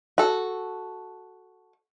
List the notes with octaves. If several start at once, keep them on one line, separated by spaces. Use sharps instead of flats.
F#4 A4